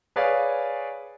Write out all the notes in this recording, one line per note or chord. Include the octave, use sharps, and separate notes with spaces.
G#4 B4 C#5 D5 F5 G#5